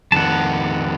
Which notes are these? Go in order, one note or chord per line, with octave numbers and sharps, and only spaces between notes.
F2 D#3 F#5 A5